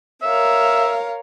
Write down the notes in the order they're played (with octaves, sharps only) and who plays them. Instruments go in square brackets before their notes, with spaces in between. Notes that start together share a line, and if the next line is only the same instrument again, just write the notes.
[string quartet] A#4 C#5 F5 [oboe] E5